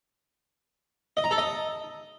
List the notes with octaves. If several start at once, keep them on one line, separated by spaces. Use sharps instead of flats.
D#5
A#5
A4
D#5